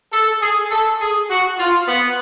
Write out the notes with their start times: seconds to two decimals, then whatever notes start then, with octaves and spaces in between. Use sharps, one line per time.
0.12 A4
0.41 G#4
0.70 A4
1.00 G#4
1.29 F#4
1.58 F4
1.87 B3